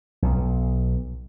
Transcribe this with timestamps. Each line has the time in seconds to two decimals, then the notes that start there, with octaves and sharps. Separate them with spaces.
0.22 B1